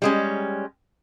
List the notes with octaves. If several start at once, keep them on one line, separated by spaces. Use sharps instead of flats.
G3 G#3 C#4